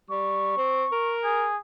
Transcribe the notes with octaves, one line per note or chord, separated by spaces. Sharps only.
G3 C#6
C4
A#4
G#4